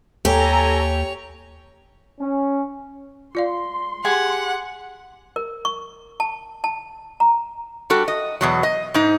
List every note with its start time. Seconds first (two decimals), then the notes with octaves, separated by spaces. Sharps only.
0.25 D#2 G4 A4 C#5 G#5 A#5 F7
2.19 C#4
3.35 F4 D5 F5 C6
4.05 G4 G#4 F#5 G#5
5.36 A#4
5.65 C#6
6.20 A5
6.64 A5
7.20 A#5
7.90 G3 F#4 A4
8.08 D#5
8.41 E2 B2 F#3
8.63 D#5
8.94 G#2 D#4